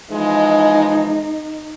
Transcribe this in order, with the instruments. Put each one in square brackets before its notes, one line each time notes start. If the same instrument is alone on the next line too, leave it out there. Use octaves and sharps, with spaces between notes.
[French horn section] E3 F3 G#3 [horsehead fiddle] D#4